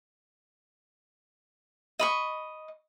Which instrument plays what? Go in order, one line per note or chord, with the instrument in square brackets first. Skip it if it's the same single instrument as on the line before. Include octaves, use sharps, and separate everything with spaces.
[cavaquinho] D#5 B5 C#6